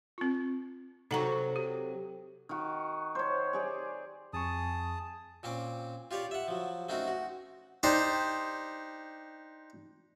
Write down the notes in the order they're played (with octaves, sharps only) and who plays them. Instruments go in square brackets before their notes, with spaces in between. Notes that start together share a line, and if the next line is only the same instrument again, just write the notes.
[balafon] C4 F4
[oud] C3 F#3 [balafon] D#4 F#5 A#5 [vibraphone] A4
[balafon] G4
[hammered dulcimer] D#3 F#4
C5 C#5
G4 G#4 D5
[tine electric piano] F2 C#6 [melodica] G#4 A5 D#6
[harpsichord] A#2 C4 C#4 D6
F4 G4 C#5 D5
E5 F#5
F3 F#3
A3 C4 C#4 D#4 F#4 A#4
F#4
D4 D#4 G4 C5